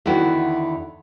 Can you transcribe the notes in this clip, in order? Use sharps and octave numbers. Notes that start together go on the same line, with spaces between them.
E2 D3 D#3 E4 F#4